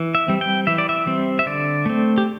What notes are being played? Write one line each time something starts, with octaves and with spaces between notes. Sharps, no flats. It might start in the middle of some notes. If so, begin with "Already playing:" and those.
Already playing: E3
E5
G3 C4
G5
E3 E5
D5
E5
G3 C4
E5
D3 D5
A3 C4
G4